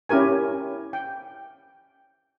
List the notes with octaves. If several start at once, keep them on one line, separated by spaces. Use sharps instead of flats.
C#4 E4 G4 A#4 G#5
G5